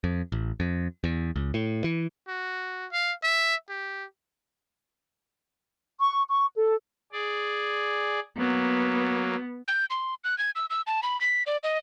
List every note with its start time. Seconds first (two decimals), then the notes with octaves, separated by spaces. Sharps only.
0.04 F2
0.32 A1
0.60 F2
1.04 E2
1.36 C#2
1.54 A2
1.84 E3
2.28 F#4
2.92 F5
3.23 E5
3.69 G4
6.00 C#6
6.29 C#6
6.56 A4
7.12 G#4 D5
8.37 F#3 A#3 B3
9.68 G6
9.90 C6
10.24 F#6
10.38 G#6
10.56 E6
10.70 E6
10.87 A5
11.03 B5
11.21 B6
11.47 D5
11.64 D#5